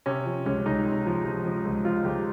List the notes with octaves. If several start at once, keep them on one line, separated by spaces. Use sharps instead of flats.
C3 C#4
F3
C#2 C#4
C#2 D#4
C3
F3
F3
F3
C#2
F3 F4
C#2 G4